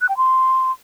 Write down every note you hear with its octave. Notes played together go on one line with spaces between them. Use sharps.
F#6
G5
C6